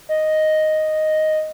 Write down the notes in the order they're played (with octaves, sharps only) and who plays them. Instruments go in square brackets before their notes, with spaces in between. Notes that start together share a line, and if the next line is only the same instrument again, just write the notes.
[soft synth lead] D#5